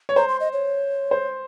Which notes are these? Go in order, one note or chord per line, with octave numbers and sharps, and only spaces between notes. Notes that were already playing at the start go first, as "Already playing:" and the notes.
C#5
C5 A#5
C6
D#5
C#5
C5